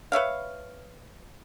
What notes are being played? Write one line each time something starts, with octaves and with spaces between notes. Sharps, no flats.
B4 C#5 E5 F5